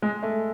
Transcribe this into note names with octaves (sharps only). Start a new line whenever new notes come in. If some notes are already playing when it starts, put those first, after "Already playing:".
G#3
A3